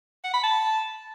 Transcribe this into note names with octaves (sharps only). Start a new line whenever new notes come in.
F#5
B5
A5